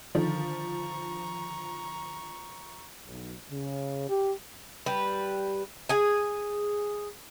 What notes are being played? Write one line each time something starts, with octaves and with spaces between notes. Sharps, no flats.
D3 D#3 F3 A#5 C#6
B1
C#3
G4
G3 B4
G#4 G#5